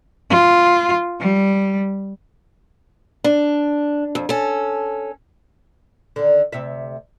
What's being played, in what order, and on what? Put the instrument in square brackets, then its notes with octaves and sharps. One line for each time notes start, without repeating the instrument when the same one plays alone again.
[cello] F4
G3
[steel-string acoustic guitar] D4
F2
C#4 A4
[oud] D3 D#3
D2 C3 E5